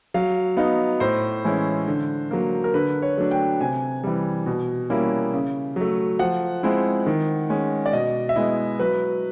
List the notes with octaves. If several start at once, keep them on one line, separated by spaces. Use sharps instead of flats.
F#3 F5
B3 D#4 F5
A2 C5
E3 G#3 C#4 E4
D3
F#3 A#3
A#4
D3 B4
C#5
F#3 A3 D4
G5
C3 G#5
E3 G3
B2
G3 A#3 C#4 E4
C#3
F#3 A3
F3 F#5
G#3 C4 E4
D#3
G#3 C#4
D5
B2 D#5
E5
G#3 B3 E4 D#5
F#3 B4